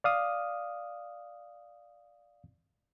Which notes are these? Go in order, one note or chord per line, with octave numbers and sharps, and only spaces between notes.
D5 F5 D#6